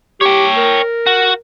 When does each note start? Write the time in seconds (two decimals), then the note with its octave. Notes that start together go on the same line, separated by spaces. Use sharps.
0.21 G4 C#5 G5
0.57 A#4
1.07 F#4